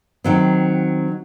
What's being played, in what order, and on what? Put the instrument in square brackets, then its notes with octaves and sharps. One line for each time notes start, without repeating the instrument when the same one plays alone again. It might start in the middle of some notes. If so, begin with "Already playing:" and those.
[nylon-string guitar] D#3 F#3 C4